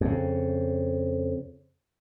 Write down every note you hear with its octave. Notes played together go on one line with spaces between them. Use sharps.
F2 C#3